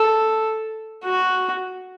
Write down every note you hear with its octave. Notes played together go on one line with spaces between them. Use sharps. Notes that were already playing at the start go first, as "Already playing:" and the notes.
Already playing: A4
F#4